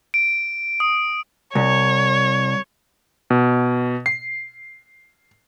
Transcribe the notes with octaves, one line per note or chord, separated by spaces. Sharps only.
D7
D#6
C2 C#5
B2
C7